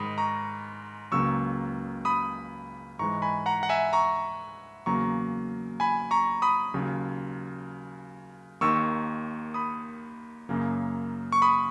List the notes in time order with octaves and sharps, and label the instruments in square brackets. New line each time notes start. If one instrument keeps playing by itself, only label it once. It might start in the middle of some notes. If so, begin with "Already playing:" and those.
Already playing: [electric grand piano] G#2 D#3 G#3 B5 D#6
A#5 C#6
C#2 C#3 F#3 A#3 C#6 E6
B5 D#6
G#2 E3 G#3 A#5 C#6
G#5 B5
F#5 A#5
F#5
E5 G#5
A#5 C#6
E2 C#3 F#3 A#3 A#5 C#6
G#5 B5
A#5 C#6
B5 D#6
D#2 C#3 F#3
D#2 D#3 A#3 C#6 E6
B5 D#6
F#2 C#3 F#3 A#3
C#6
B5 D#6